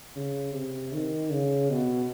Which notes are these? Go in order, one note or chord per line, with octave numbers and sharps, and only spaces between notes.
C#3
C3
D#3
C#3
B2